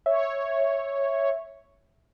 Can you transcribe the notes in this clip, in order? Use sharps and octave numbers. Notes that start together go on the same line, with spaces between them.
C#5 E5